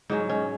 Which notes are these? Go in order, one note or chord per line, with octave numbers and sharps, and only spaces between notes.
G#2 F#3 C#4 D#4
C#4